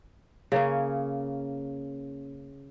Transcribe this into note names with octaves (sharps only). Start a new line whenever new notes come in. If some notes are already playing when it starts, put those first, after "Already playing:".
C#3 A#3 C#4